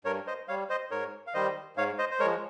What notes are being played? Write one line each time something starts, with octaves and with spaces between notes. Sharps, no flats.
G2 A#4 C#5
C5 D#5
G3 C#5 F5
C5 D#5
G#2 A#4 C#5
F5
D#3 G3 C5 D#5
G#2 C#5 F5
C5 D#5
C5
G#3 A#4 C#5
F3